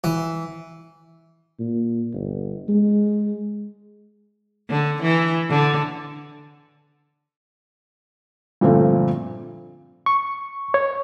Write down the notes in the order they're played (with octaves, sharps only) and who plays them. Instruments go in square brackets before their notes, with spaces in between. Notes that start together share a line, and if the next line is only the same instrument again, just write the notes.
[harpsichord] E3
[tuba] A#2
G1
G#3
[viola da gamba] D3
E3
D3
[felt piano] G2 A#2 D3 F3 A3 C4
[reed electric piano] C#6
C#5